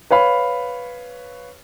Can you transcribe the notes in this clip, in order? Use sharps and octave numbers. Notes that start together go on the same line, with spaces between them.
B4 C#5 F5 B5